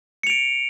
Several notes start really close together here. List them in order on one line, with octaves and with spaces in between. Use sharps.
C#7 F7 D7